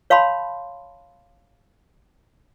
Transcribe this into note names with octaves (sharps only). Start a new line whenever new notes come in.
C#5 F5 A5 B5 C6